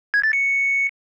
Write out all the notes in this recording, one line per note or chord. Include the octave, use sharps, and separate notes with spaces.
G#6
A6
C#7